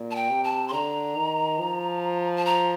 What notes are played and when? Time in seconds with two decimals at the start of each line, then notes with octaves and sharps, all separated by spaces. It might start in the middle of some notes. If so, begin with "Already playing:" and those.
Already playing: A#2
0.11 A5
0.15 G5
0.29 C3
0.44 A5
0.68 C6
0.73 D3 A#5
1.16 D#3
1.60 F3
2.37 A5
2.46 A#5